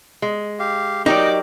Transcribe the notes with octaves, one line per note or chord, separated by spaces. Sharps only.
G#3
G4 F5
F#3 D#4 G4 A#4 D5 D#5 G5 D6